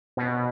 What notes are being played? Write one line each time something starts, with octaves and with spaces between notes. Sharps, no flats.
B2